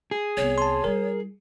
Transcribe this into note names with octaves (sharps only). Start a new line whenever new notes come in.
G#4
C2 B3 C#5
A5 C6
G3 E4 A#4